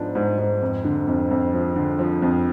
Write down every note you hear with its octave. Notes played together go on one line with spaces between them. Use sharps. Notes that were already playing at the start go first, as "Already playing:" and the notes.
Already playing: G#2 F3 B3 D4
G#2
G#2
F2
D3
F2
F2
F3
D3
F3
F2